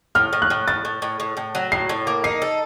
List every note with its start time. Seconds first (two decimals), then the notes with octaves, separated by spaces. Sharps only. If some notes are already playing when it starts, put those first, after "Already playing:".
0.15 A2 F6
0.33 A2
0.42 F#6
0.50 A2
0.68 A2 A6
0.85 A2
1.02 A2
1.20 A2
1.37 A2
1.55 F#3
1.72 A2 C7
1.89 A2
2.07 A#3
2.24 D#4 C7
2.42 A4